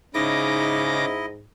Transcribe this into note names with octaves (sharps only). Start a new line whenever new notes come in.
G#2 C#3 D#4 E4 D#5 D6 A#6